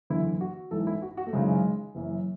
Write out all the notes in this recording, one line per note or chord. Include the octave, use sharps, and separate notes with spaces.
F#1 E2 D3 E4
F#4
A1 G#2 E3 A4
E4
F#4
F#4
A3
G#1 F#2 C#3 E3 G#3
F#1 F#2 E3